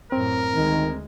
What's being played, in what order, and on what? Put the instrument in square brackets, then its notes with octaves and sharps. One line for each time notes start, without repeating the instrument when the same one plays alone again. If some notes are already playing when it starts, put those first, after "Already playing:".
[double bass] F#2 A2 [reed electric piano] C4 [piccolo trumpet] A#4
[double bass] D2 G#3 [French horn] D#3